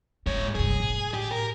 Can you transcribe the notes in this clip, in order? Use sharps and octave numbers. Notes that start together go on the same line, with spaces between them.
G#2 C4 C#5
C2 G2 G#4
A2
G4
A#4